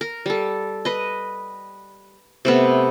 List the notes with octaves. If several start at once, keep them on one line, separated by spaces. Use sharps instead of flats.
A#4
G3 A4
B4 D#5
C3 A3 B3